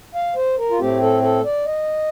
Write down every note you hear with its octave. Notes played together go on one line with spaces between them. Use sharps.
F5
C5
A#4
F4
A2 A3 C4 G4
A4
A4
D5
D#5